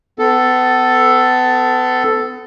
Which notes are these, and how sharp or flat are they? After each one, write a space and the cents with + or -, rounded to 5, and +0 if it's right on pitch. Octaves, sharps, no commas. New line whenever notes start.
B3 +35 A4 +0